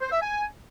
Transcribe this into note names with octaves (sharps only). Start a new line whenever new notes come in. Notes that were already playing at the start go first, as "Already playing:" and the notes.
C5
E5
G#5